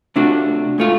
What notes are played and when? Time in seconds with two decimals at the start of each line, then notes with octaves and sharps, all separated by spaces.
0.16 C3 A3 D4 F4 F#4
0.78 G#2 A3 F4